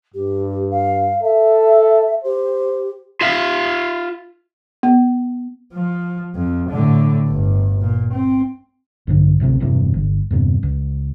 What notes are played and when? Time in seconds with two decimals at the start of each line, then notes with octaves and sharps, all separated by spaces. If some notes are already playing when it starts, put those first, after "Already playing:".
0.14 G2 G4
0.71 F5
1.23 A4 E5
2.24 G4 C5
3.21 F4 E5 F5
4.83 B3
5.73 F3
6.35 F2
6.70 A2 D3
7.28 G1
7.81 A#2
8.13 C4
9.07 A#1 G2 D3
9.40 D1 A1 C3 C4
9.60 E1 E2 G2 C3
9.94 G1
10.31 E2 G2 C3
10.63 C#2